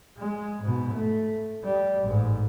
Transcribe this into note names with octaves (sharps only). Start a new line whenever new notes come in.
G#3
G#2 B2
A3
G3
A1 G#2